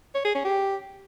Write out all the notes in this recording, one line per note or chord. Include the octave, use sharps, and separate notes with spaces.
C#5
G#4
C#4
G4